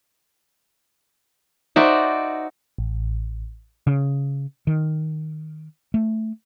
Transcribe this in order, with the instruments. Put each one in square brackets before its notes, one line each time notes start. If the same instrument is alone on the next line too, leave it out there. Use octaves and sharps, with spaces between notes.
[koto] D#4 F#4 [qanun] C5 D5 E5
[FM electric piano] A1
[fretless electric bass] C#3
D#3
A3